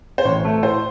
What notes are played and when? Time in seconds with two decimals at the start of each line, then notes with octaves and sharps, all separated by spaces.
0.18 C5
0.25 A1 C#5
0.45 A3
0.62 A2 C5